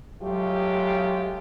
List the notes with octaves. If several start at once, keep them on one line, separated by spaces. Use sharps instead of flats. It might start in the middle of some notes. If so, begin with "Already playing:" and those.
F#3 G#3 A3 F4 G4